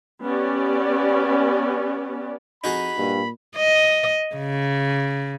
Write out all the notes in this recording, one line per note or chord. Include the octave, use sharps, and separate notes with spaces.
B3 C#4 G4 D5
F2 D#4 F#4 G#4 B5
G2 A#2
D#5
C#3